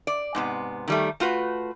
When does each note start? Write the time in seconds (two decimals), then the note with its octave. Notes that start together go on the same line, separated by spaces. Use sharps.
0.07 D5
0.35 G#2 C3 B3
0.88 D#3 G3 A3
1.20 A3 F4 F#4 B4